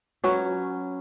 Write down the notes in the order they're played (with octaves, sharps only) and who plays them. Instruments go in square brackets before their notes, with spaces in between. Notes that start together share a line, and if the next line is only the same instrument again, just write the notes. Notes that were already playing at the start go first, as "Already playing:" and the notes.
[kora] F#3 C#4 B4